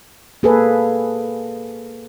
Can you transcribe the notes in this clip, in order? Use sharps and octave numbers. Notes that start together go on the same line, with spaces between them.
A#3 G#4 A4 B4